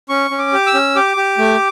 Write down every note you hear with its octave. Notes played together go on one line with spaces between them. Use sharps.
C#4 C#6
C#4
D6
G4
E6
C#4
G4 D6
G4
A3